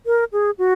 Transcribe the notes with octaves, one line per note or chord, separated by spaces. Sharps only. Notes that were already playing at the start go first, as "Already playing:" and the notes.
A#4
G#4
F#4